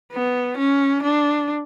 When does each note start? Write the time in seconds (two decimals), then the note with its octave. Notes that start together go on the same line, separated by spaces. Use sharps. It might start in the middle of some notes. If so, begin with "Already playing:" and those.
0.12 B3
0.57 C#4
1.03 D4